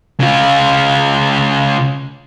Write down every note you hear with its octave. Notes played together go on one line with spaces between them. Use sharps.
C#3 F4